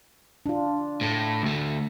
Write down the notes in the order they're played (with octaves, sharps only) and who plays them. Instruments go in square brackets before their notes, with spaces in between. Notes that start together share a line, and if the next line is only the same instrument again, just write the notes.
[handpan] D4 F4
[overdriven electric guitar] A2 A4
D2 A3